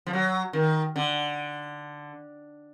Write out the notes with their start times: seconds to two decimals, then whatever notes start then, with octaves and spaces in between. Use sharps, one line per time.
0.06 F3
0.13 F#3
0.53 D#3
0.96 D3